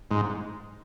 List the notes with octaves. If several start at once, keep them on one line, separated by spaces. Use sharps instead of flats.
G#2